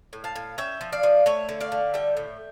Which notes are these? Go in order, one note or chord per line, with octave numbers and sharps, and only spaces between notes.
A2
F5 A5
A2
C#4 E5 G5
F3
D5 F5
F3
A3 C#5 E5
D3
D5 F5
D3
G3 E5 G5
A2